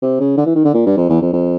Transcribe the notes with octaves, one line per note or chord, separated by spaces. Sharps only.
C3
C#3
D3
E3
D#3
D3
A#2
G2
F2
E2
F2
F2